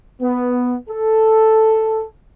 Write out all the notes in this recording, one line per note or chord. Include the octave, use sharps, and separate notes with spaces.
B3
A4